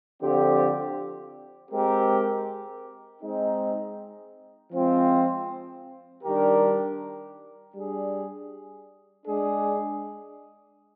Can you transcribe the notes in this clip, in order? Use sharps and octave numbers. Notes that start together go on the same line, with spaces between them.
D3 F3 C4 G4
G#3 C4 G4 A#4
G#3 C4 D#4
F3 G#3 C4 F4
D#3 G3 D4 G4 A#4
G3 D4 G#4
G#3 D4 G#4